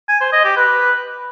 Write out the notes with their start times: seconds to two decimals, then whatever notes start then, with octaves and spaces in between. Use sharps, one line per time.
0.09 G#5
0.21 C5
0.33 D#5
0.45 G4
0.57 B4